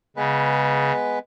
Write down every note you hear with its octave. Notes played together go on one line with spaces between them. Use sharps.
C#3 G#3 B3 B4